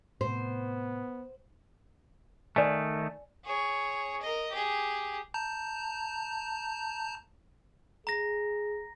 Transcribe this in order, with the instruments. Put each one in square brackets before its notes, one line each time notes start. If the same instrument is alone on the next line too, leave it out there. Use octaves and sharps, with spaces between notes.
[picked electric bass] A2 C3 [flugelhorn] B3 [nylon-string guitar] C5
[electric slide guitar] D#3 A3 [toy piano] D5 G#5
[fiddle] G#4 C#5
A#4 D#5
G4 G#4
[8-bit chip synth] A5 A#5 G6
[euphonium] G#4 [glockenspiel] A#5 A#6